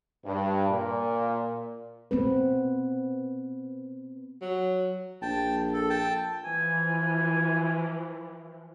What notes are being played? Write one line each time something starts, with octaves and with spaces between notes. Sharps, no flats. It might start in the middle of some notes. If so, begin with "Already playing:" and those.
G2
A#2
B3 C4 B4
F#3
A#1 G5 A5
A4
G5 A5
E3 F3 G#5